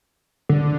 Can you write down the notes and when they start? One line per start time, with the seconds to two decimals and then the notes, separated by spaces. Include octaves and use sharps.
0.49 D3